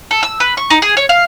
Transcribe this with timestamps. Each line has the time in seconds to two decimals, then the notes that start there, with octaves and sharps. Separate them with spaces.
0.11 A4
0.23 E6
0.40 B4
0.57 C#6
0.70 D#4
0.82 G#4
0.97 C#5
1.09 F5